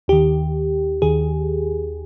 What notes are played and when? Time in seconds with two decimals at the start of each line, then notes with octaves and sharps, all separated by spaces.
0.08 D#2 D#3 G4
1.02 D#2 D#3 G#4